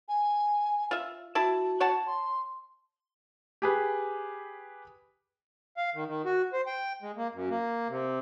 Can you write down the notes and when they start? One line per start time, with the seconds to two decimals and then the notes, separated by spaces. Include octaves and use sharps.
0.08 G#5
0.91 F4 E5
1.35 E4 F#4 A5
1.80 C#5 F#5 A5
2.07 C6
3.62 G4 G#4 B4
5.77 F5
5.95 D#3
6.08 D#3
6.25 F#4
6.53 C5
6.67 G5
7.02 G#3
7.17 A#3
7.34 F#2
7.50 A#3
7.89 C3